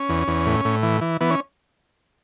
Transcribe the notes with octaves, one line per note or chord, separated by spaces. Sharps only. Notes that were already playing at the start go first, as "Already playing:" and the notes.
Already playing: C#4
E2
E2
A2
A2
E3
E3
E3 B3
C#4